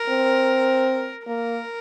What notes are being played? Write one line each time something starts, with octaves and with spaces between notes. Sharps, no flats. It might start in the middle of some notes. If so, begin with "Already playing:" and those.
Already playing: A#4
C4
A#3 A#4